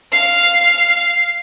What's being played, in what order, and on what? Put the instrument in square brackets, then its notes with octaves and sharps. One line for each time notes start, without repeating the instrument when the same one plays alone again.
[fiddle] F5 [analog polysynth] C7